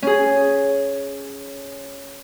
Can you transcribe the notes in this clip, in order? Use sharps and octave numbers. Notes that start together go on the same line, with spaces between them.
C#4 G#4